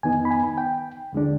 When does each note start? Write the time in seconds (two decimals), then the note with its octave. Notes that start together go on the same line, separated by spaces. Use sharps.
0.03 F2 D#3 B3 D#4 G#5
0.25 B5
0.31 G#5
0.58 G5
1.13 D#2 D3 G#3 D4